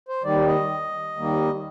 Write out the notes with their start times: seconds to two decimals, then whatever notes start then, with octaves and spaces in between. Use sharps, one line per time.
0.09 C5
0.24 D#2 D#3 G3 D5
0.47 D#5
1.16 D#2 D#3 G3 A#3